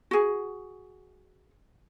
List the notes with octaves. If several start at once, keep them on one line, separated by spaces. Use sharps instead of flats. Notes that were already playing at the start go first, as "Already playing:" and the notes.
F#4 G#4